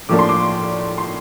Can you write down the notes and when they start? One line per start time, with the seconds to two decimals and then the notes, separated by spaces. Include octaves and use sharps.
0.09 A2 F3 A#3 D4 D6
0.19 C6
0.29 D6
0.98 C6